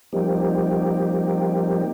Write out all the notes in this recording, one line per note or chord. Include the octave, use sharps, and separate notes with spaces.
F3 G3 A#3 C4 D#4 G4